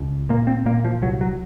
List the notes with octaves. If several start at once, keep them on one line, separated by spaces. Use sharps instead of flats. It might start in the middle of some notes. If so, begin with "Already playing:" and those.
Already playing: C#2
A#2 A#3
C4
A#2 A#3
F3
C2 F#3
F#3